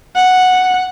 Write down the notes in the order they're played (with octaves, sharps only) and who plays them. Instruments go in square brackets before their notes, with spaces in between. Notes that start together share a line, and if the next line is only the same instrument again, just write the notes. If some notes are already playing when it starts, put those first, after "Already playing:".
[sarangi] F#5